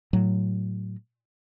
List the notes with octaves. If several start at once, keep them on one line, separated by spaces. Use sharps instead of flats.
A2 F#3